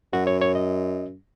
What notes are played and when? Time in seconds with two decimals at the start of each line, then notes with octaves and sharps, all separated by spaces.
0.13 F#2 F#4
0.27 C#5
0.42 C#5
0.55 D#5